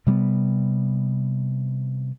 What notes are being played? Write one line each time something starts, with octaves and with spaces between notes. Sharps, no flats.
C3 G3 A#3 B3